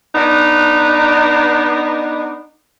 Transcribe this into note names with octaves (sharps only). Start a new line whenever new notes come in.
B3 D4 D#4